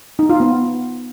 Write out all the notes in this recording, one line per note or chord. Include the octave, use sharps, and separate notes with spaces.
D#4
F4
B3